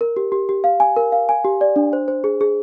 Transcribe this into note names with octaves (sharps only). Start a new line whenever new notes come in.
A#4
G4
G4
G4
F5
G#5
A#4
F5
G#5
G4
D5
D4
C5
C5
G#4
G#4